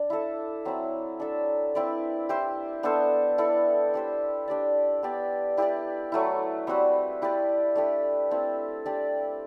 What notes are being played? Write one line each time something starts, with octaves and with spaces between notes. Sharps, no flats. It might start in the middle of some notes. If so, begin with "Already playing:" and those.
Already playing: D4
E4 A4 E5
F#3 C4 E4
D4 A4 E5
C4 E4 B4 D5
E4 G4 C5
B3 D4 A4 C5
E4 A4 D5
D4 G4 C5
D4 G4 D5
B3 D4 G4 D5
E4 G4 B4 D5
F#3 A3 E4
G3 C4 F#4 B4
E4 G4 B4 D5
A3 D4 G4 B4
C4 E4 A4
D4 G4 D5